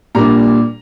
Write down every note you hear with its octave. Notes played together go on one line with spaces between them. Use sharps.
A#2 G3 A#3 D4 A#5